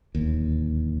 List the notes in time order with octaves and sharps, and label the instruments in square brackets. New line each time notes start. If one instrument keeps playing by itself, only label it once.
[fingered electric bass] D1 D#2